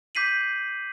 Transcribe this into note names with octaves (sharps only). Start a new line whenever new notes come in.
D6 G6 B6 C7 D#7 F#7